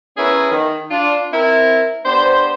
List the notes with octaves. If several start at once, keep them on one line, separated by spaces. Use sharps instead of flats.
B3 C#4 E4 G#4 A#4 B4
D#3
D4 F4
C4 E4 A#4
B3 D4 G4 C5